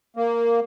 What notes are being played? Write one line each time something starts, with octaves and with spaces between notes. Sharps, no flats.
A#3